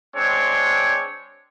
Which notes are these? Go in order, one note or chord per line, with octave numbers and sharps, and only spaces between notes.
G#3 C4 D4 C#5